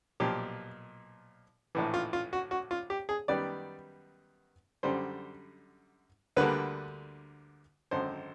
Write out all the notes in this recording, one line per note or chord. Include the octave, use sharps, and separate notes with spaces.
B1 A#2 F3 G4
A#1 A2 E3
F4
F4
F#4
F#4
F4
G4
G#4
F#2 D#3 G3 B3 D5
F#2 D3 G3 C5
D2 D3 G3 A#3 B4
G#1 F#2 D3 C5